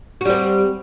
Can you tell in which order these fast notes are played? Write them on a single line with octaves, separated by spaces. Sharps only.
F#4 G3 C4